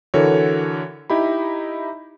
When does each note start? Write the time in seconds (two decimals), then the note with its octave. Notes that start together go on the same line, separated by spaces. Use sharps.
0.14 D3 E3 F#4 A4 A#4 C#5
1.10 D#4 E4 G4 B5